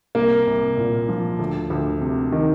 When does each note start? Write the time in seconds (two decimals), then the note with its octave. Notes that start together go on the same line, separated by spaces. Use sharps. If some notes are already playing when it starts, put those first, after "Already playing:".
0.15 C2 A#3
0.47 C2
0.77 A#2
1.09 F3
1.39 D2
1.70 D2
2.01 C3
2.32 D#3